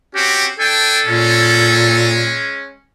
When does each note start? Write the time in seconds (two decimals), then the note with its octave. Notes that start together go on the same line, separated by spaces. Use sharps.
0.15 C4 C#4 F#4 G4
0.59 D4 A4 G5 G#5
1.06 A#2 G#3 C#4